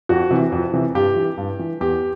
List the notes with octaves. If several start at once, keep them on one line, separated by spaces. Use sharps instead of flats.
F2 F#4
C3 E3
F2
C3 E3
G2 G4
E3
G2
E3
E2 G4